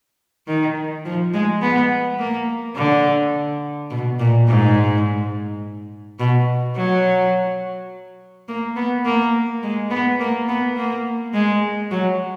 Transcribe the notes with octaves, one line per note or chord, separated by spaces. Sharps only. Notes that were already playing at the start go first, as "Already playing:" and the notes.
D#3
F3
G#3
B3
A#3
D3
B2
A#2
G#2
B2
F#3
A#3
B3
A#3
G#3
B3
A#3
B3
A#3
G#3
F#3